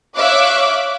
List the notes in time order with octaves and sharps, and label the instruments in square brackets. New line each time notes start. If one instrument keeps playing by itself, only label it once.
[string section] C#5 E5 F5 D6 F#6